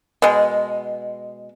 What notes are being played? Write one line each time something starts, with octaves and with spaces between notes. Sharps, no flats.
B2 G#3